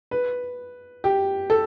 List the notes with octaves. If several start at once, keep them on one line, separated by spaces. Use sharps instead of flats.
B4
G4
A4